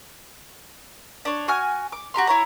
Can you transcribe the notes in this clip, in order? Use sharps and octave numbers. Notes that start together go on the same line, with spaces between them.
D4 C#5
F#4 G#5 F6
D6
F#4 G4 A#5 C6
E4 C#5 A#5